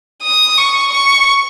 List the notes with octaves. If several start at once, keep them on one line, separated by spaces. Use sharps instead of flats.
D#6
C#6
C#6